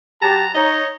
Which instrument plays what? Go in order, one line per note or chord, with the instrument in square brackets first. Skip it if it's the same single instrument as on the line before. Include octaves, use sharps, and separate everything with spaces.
[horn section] F#3 G4 A5 [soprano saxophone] A#5
[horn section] D#4 C#5 [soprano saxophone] D#5